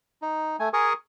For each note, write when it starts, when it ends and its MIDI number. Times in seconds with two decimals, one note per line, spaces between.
0.22 0.56 63
0.59 0.69 57
0.59 0.69 80
0.73 0.93 68
0.73 0.93 70
0.73 0.93 80
0.73 0.93 85
0.73 0.93 87